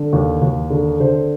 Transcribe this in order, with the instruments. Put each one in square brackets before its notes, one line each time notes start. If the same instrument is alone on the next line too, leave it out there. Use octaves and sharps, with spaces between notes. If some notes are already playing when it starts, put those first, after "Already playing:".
Already playing: [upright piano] D3
D#2
D#2
D3
D3 C5